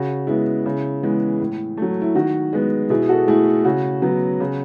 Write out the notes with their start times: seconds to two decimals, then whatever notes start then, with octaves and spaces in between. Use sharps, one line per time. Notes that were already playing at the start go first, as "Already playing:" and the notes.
Already playing: C#3 F#4
0.27 G#3 B3 E4
0.66 C#3
1.03 E3 G#3 B3
1.40 A2
1.77 F#3 A3
2.02 E4
2.15 D#3 F#4
2.53 G#3 B3
2.90 B2 E4 G#4
3.09 F#4 A4
3.28 A3 E4 G#4
3.65 C#3 F#4
4.02 F#3 B3
4.40 C#3